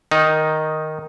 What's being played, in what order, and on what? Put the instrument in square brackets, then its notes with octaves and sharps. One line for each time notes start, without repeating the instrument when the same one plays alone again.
[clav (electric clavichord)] D#3 D#4